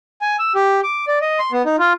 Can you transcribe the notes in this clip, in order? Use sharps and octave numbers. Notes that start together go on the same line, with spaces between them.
G#5
E6
G4
D6
D5
D#5
C6
B3
D#4
F4